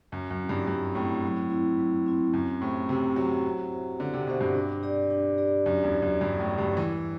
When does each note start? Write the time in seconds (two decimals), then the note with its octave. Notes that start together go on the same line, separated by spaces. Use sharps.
0.12 F#2 F#3
0.30 F#2
0.40 C4 E4
0.49 G2
0.67 G2 F#3
0.95 A2 C4 E4
1.23 F#3
1.50 C4 E4
1.78 F#3
2.06 C4 E4
2.33 F#2 C4
2.61 A2 G4 C5 E5
2.89 C3 C4
3.16 F#3 G4 C5 E5
3.44 C4
3.72 G4 C5 E5
4.00 D3 C4
4.14 C3
4.27 B2 G4 C5 E5
4.41 G2
4.55 D4
4.83 G4 D5
5.11 D4
5.38 G4 D5
5.66 F#2 D4
5.84 E2
5.93 G4 D5
6.02 F#2
6.21 G2 D4
6.39 A2
6.49 G4 D5
6.58 G2
6.76 E3 G3